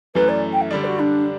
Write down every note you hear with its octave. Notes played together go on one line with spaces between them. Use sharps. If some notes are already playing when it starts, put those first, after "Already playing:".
F#2 E3 A3 B4
D5
G5
E5
D3 G3 D4 D5
F#4
D4